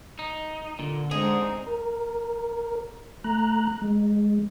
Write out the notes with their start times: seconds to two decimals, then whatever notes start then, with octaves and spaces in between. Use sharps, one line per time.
0.19 D#4
0.79 A#2 D3
1.11 G#3 C4 D#4 G#4
1.67 A#4
3.24 A3 A#5 F#6
3.82 G#3